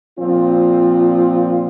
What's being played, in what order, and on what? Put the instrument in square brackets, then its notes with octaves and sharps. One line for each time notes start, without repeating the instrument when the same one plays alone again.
[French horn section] A#2 F3 C4 F4